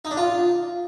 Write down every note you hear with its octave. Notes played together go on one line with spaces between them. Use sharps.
D#4
D4
F4